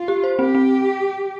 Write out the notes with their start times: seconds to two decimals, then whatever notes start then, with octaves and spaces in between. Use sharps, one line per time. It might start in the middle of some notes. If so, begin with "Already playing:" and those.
Already playing: F4
0.08 G4
0.24 C5
0.39 C4 G4
0.55 C4